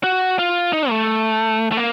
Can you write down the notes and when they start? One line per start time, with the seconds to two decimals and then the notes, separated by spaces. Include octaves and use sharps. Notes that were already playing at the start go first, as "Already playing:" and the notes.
0.04 F#4
0.39 F4
0.73 D#4
0.90 A3
1.72 A3
1.77 A#3